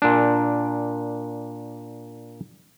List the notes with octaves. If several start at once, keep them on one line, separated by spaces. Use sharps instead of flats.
A#2 D4